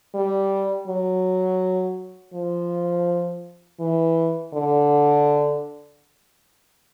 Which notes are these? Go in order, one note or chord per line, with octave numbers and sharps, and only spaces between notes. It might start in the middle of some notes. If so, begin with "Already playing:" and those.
G3
F#3
F3
E3
D3